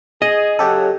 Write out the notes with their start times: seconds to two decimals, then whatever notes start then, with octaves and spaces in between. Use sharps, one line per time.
0.22 G#4 D#5
0.59 C#3 F#3 G4 A4